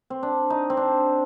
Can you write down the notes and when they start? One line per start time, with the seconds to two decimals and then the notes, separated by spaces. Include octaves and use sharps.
0.10 C4
0.23 D4
0.50 D#4
0.70 C4
0.77 D4